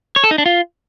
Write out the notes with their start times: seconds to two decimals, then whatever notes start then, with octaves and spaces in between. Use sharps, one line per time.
0.16 C#5
0.24 A4
0.31 D#4
0.38 D4
0.46 F4